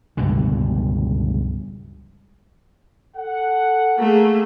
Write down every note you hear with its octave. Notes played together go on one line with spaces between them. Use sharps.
C#2 G2 B2 D3
A4 F#5
A3 A#3 G#4